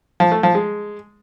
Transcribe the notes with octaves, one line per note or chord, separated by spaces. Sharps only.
F3
A3
F3
G#3